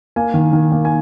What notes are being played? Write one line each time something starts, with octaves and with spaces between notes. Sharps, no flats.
A#3 G#5
D#3
D#3
A#3
G#5